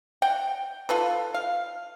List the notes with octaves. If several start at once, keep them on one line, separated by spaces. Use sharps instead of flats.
F#5 G5
F4 A4 B4
F5